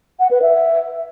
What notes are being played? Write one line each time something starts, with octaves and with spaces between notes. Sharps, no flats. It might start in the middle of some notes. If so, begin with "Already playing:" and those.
F#5
B4
E5